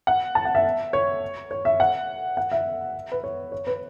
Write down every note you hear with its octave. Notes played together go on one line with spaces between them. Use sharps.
F#5
A5
F#5
E5
C#5
C#5
E5
F#5
F#5
E5
B4
C#5
C#5
B4